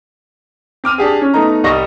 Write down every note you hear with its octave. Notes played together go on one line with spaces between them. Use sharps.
C4 D6 F6 D#7
D4 G4 G#4
C#4
A3 B3 D#4 A#5
C2 G3 D#5 C#6 A#6